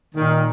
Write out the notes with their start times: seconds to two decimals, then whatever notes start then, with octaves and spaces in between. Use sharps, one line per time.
0.15 A#2 D#3